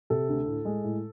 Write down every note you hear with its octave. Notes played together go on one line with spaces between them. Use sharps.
C3 A4
D2
A2
G#3
A2